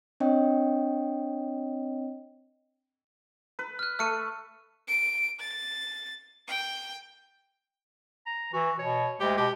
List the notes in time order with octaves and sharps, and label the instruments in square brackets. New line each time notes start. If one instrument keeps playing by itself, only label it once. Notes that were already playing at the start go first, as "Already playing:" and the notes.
[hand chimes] C4 D4 C#5 D#5 G5
[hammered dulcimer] B4
[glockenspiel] F6 F#6
[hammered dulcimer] A3 [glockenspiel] F6 C#7 D#7
[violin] D7
A6
G5
[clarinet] A#5
[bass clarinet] E3 [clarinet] F#4
[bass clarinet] B2 [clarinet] C#5
[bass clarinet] D2 [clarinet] G#3 [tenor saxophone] G4
[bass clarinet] B2 [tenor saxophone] G4